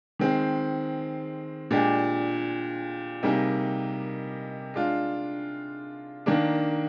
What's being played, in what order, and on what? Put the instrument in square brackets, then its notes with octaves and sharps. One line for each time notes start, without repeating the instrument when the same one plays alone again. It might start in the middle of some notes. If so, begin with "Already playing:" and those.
[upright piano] D#3 G#3 C4
A#2 G#3 D4 G4
C3 G3 A#3 D#4 G#4
G#3 D4 F4
D#3 A#3 D4